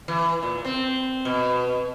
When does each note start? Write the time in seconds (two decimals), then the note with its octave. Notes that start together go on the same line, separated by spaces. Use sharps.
0.08 E3
0.43 A#2
0.65 C4
1.25 B2